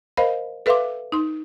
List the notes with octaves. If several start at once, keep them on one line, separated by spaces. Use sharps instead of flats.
A#4 C5 D#5 F5 B5
A4 B4 E5 F5 C6 D6
D#4 C6